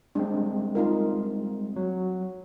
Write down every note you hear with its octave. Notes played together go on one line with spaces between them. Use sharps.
G3 G#3 C4 D4
D#4 F4 A#4
F#3